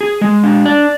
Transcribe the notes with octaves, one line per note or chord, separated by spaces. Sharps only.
G#4
G#3
D4
D5